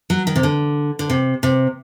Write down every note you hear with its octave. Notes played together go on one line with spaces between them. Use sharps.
F#3
D#3
C3
D3
D3
C3
C3